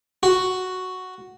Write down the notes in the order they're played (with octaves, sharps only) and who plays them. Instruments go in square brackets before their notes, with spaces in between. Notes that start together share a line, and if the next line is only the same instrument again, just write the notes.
[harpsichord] F#4